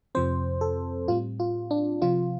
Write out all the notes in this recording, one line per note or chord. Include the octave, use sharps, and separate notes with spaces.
F2 C3 F3 C4 C5
A4
A2 G3 C4 F4
F4
D4
C3 F3 C4 F4